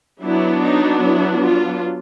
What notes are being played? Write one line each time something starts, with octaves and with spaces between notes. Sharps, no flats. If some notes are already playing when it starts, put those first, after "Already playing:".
F#3 B3 D4 E4
D#4
E4
F4